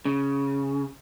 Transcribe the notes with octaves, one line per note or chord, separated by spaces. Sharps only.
C#3